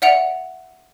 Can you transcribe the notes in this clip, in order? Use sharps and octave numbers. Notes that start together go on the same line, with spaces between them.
D5 E5 F#5 C#7 D7 F7